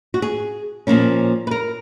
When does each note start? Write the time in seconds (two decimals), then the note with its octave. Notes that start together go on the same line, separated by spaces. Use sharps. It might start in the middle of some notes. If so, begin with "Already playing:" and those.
0.14 F#4
0.22 G#4
0.87 A#2 F3 A#3 C#4
1.47 B4
1.51 A#4